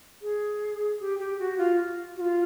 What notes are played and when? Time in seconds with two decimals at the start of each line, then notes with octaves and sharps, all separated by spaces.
0.22 G#4
1.00 G4
1.19 G4
1.39 F#4
1.58 F4
2.16 F#4
2.21 F4